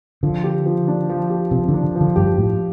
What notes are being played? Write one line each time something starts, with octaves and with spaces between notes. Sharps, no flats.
D3 F3
G4
F3
D4
F3
G4
C3 F3
D3
D4
D3
F3
D3
G2 G4
A2 F3